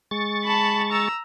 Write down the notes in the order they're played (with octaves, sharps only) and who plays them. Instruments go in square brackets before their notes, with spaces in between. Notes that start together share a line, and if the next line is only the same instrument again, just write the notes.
[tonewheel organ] G#3 C#6 A6
[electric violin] A5 B5
A#5 E6